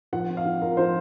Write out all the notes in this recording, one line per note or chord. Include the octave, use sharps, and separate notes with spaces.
F3 F#5
C4
F5
F3
F4 A#4
F3 C5